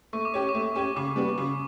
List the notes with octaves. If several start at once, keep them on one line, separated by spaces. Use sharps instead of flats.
A3 C#6
D6
C#4 G4 C#5 C#6
D6
A3
C#6
C#4 G4 C#5
C#3 D6
G3 B3 F#4
C#3